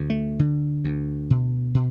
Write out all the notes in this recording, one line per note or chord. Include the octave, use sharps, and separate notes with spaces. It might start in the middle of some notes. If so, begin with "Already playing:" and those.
Already playing: D2 D3
A3
D3
D2
B2
B2